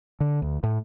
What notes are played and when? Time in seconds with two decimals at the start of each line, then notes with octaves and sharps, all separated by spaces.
0.20 D3
0.42 D2
0.63 A2